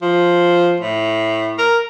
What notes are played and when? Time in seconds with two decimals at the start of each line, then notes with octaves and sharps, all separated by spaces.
0.02 F3
0.80 A2
1.58 A#4